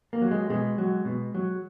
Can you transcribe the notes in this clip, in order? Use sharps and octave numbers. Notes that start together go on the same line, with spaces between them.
A#3
F#3
G#3
B2 G#3
F#3
B2
F#3